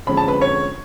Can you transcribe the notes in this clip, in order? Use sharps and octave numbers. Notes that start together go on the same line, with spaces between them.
F2 D3 G#3 C#4 B5
A5
B4 B5
C#5 C#6